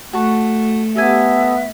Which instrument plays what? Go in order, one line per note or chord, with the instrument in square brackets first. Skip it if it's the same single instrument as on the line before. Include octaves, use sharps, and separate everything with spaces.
[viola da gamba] A3 [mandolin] F#4 A5 C#6
[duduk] B3 [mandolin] G4 A4 G#5 [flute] E5